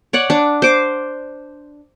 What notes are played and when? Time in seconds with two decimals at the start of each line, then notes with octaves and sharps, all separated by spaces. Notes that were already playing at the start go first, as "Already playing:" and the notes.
0.13 C#5 D5 F#5
0.30 D4
0.62 C5 D6